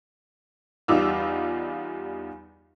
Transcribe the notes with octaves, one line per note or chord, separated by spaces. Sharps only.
E2 G3 D#4 F4 D6 E6